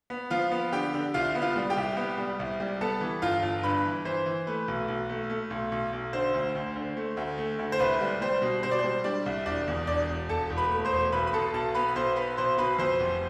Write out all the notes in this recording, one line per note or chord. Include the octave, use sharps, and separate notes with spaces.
B3
F3 F4 F5
B3
D3 G4 G5
D3
C2 F4 F5
B3
F4 F5
G3
G4 G5
C2
B3
G3
C2
G3
B3 A4 A5
E3
G1 F4 F5
G1
G2 B4 B5
E3
E3 C5
E3
A3 B4
B1
B1
A3
A3
B1
B1
B1
D3 C5
D2
D2
D3
A3
D2
A3
D2
C5
C2 B4
G3
G3 C5
B2
B2 C5
D5
C5
G3
G3 D4 D5
C2
E1 D4 D5
E2
E1 D4 D5
E1
E1 A4 A5
E1
B4 B5
A3
C5 C6
E1
B1 B4 B5
B5
B2 A4 A5
B1 A4 A5
B3 B4 B5
B1 C5 C6
B3 B4 B5
B1 C5 C6
B2 B4 B5
F2 C5 C6
F1